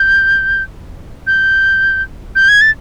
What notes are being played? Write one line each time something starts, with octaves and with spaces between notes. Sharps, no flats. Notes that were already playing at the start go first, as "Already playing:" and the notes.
Already playing: G6
G6
G6
G#6
A6